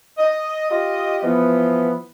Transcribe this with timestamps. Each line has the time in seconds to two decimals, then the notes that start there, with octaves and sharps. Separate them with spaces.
0.18 D#5
0.71 F4 G4 D#5
1.23 E3 F3 B3